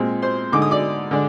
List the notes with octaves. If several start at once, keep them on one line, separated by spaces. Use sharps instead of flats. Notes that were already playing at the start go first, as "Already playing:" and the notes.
Already playing: A#2 G#3 C4
C5 C6
D3 G#3 D#4 D6
D#6
D5 D6
D3 G#3 D4